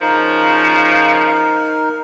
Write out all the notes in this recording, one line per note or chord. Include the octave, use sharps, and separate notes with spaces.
C#3 F3 D#4 A#4